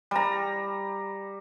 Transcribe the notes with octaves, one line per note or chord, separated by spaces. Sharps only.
G3 A#5